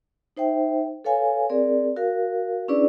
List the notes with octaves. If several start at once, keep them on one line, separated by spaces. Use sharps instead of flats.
D#4 C5 E5 G5
A4 B4 C#5 F5 G#5
C4 G#4 A#4 D5
F#4 A#4 F5
C#4 D4 E4 G#4 B4 D5